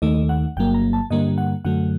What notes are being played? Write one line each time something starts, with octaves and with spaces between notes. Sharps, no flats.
D#2 D#3 A3 D#5
F#5
G1 G2 F#3 A#3 G5
A#5
A5
G2 D3 G3 A#3 D#5
F#5
F#2 D3 F#3 A3 F#5